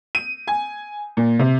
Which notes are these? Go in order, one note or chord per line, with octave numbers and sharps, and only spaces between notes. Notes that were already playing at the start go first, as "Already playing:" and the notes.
D#7
G#5
A#2
C3